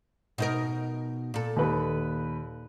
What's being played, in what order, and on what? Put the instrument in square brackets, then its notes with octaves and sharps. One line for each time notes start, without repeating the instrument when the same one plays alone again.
[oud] B2 D#4 A#4
A#2 A4
[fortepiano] D#2 B4